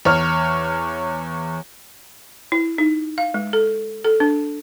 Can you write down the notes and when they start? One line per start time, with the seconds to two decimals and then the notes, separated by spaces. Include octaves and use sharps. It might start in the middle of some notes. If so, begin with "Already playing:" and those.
0.05 E2 C#5 F6
2.52 E4
2.78 D#4
3.18 F5
3.34 G#3
3.53 A4
4.04 A4
4.20 D4